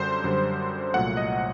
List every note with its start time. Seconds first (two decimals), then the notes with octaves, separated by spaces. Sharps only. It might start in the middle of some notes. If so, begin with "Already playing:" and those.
Already playing: F#2 D3 G3 C5
0.24 F#2 D3 G3
0.94 C2 A#2 F#3 A3 F#5
1.17 D#5